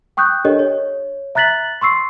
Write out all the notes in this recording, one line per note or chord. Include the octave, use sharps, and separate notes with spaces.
G5 C#6 D#6 F#6 G6
D4 G4 A4 A#4 C#5 D#5
C#5
E5 A#5 F#6 A6 B6 F#7
C6 C#6 E6 C7